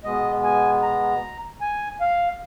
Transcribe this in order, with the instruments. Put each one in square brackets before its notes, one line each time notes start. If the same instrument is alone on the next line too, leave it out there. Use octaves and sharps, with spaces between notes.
[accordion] B2 G#3 B3 D#5
G#5
A#5
G#5
F5